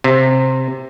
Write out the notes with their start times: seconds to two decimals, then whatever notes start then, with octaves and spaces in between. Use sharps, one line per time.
0.04 C3